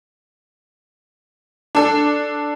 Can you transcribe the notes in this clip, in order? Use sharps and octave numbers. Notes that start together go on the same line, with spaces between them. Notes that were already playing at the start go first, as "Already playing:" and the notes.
D4 A4